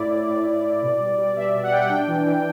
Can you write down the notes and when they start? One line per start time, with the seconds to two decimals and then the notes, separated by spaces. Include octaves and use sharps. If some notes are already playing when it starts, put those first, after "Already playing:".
Already playing: A2 E4 D5
0.11 A2
0.28 A2
0.47 A2
0.64 A2
0.82 B2
0.99 G3
1.18 G3
1.36 B2 E5
1.54 B2
1.63 F#5
1.71 G3 G5
1.80 F#5
1.89 D4 G5
2.07 E3
2.26 E3